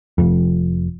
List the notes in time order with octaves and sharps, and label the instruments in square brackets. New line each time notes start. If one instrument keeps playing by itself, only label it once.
[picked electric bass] F1 F2